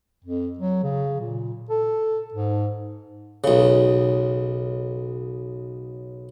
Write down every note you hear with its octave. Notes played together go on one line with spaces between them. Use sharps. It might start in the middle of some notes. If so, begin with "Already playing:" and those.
F2
F#3
C#3
A#2
A4
G#2
B1 C#3